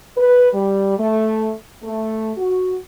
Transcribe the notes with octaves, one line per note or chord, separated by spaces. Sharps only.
B4
G3
A3
A3
F#4